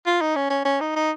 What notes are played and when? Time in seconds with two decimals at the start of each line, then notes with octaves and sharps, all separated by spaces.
0.06 F4
0.21 D#4
0.36 C#4
0.50 C#4
0.65 C#4
0.81 D#4
0.96 D#4